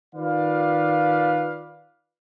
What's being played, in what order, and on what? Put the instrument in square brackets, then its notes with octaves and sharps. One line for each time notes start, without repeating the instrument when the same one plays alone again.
[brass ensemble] D#3 F4 B4 D5 F5